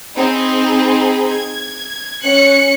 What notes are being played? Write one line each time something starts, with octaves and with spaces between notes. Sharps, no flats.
C4 D#4 G#4 B5
G#6
C#4 F#6 C#7